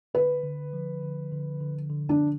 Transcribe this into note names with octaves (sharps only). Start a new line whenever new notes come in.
D3 B4
D3
F3
D3
D3
D3
D3
D4
D3